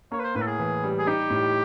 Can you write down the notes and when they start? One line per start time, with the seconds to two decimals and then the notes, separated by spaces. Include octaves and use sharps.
0.12 A#3 C#5
0.19 B4
0.24 C5
0.35 A2 B4
0.42 A4
0.47 G#4
0.59 E3
0.84 G3
0.99 G#4
1.07 D#4 G4
1.30 A2